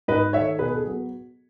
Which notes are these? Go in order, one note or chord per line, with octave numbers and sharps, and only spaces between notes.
G#2 B4 D#5
D#3 A3 C#5 E5
B2 G#4 B4
A4
G#4
F#3 B3